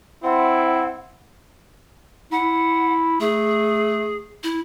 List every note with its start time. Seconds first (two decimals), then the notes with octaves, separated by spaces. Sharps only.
0.24 C4 E4 F#5
2.32 E4 F#5
3.20 A3 G#4
4.44 E4